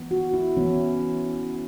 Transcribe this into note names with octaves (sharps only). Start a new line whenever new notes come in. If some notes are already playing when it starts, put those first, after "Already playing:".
Already playing: E3 B3
F#4
E4
E3 B3 C#4